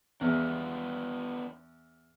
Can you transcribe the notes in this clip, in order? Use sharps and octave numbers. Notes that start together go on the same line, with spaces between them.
E2 B3 D4